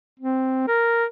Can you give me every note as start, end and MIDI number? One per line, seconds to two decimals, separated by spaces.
0.20 0.63 60
0.68 1.05 70